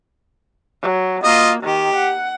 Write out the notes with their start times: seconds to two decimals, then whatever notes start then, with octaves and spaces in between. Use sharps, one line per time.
0.82 F#3
1.24 A#3 F4 D#5
1.63 D#3 G4
1.95 F#5